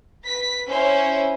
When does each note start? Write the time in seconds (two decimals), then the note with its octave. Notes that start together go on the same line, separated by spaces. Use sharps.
0.25 B4 B6
0.68 C#4 E4 C5